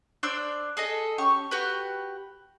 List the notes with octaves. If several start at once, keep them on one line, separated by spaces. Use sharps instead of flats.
D4 C5 D5 E6
G#4 A4 D#5
C#4 G4 C#6
F#4 G4 B4